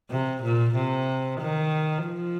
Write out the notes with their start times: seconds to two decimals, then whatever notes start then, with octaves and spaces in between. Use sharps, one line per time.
0.11 C3
0.43 A#2
0.75 C3
1.41 D#3
2.06 F3